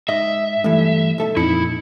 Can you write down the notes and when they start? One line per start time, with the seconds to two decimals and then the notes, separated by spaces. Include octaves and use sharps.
0.08 G#2 D#5 E5
0.64 G2 E3 A3
1.18 B1 A4 E5
1.37 F2 A#2 D#4 E4 C#7